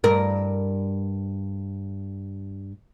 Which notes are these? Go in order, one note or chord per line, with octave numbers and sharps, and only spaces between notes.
G2 A#4